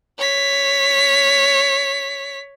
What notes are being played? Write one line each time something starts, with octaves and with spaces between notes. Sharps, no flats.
C#5 B6